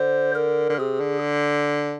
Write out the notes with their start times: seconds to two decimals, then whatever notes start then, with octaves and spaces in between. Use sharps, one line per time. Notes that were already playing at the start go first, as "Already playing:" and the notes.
Already playing: D3 C5
0.35 A#4
0.69 D3
0.79 C3 G#4
1.00 D3